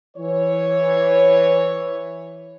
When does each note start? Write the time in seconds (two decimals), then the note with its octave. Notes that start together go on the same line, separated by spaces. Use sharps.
0.17 E3 C#5